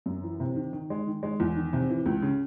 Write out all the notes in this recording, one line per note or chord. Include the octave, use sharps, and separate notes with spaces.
F#2
E3
C3
D#3
D#3
G#3
D#3
G#3
E2
D#3
C3
E3
C#2
C#3